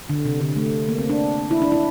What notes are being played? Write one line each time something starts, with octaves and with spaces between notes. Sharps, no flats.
D3
C3
D3
A3
A#3
C4
D4
E4
D4
E4